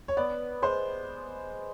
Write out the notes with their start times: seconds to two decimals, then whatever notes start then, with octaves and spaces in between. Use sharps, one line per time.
0.08 C#5
0.17 B3 D5
0.62 G#3 C5